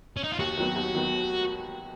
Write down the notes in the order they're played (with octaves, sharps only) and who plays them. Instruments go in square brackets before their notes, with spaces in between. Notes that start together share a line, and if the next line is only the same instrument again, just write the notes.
[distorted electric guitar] C#4
D#4
F4
[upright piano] D#2 [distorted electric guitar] F#4
[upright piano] D#3 F#3 B3
D#2
D#3 F#3 B3